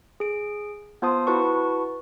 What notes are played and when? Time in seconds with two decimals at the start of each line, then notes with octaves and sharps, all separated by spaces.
0.20 G#4 D7
1.02 B3 F4 C5 A5 C6 D#6
1.27 E4 F#4 B4 A5 C#6